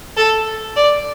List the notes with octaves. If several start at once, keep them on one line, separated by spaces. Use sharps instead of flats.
A4
D5